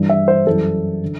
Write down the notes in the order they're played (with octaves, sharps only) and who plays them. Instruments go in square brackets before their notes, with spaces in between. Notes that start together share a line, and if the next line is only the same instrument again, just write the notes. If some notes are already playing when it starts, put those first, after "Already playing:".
Already playing: [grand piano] G2 E3 G3
E5
C5
F#2 E3 G3 A4
D3